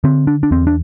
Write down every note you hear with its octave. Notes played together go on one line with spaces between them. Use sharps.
D3 C4
D4
D4
E2 C4
D4